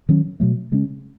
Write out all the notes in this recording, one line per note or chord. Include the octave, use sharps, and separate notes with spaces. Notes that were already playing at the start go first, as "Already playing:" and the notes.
D#3 F#3 C#4
B2 F#3 A3
C#3 G#3 C#4